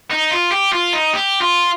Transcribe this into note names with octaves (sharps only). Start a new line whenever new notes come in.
D#4
F4
G4
F4
D#4
G4
F4